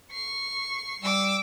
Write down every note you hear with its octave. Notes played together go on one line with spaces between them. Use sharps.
C#6 C7
G3 D6 E6